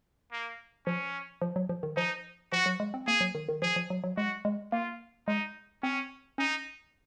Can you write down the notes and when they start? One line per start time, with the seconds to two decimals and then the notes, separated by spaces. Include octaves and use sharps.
0.32 A#3
0.86 F3 C#4
1.42 F3
1.56 F#3
1.69 F3
1.83 D#3
1.96 F3 D#4
2.52 F3 F#4
2.66 F#3
2.80 G#3
2.94 C4
3.07 A#3 G#4
3.21 F#3
3.35 D#3
3.49 D#3
3.62 F3 G#4
3.76 F3
3.90 F#3
4.04 F#3
4.17 G#3 F#4
4.45 G#3
4.72 A#3 F4
5.28 G#3 D#4
5.83 C4 C#4
6.38 C#4 D#4